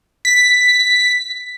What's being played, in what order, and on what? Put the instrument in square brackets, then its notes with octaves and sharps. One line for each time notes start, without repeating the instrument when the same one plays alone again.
[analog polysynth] B6